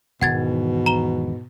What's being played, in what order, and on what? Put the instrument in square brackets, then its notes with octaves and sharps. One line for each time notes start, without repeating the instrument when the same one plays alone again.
[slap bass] E1 D#3 E3 [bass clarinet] G#2 [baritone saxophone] B2 [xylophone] F#5 G#6 A6
[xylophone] A#5 E7 G7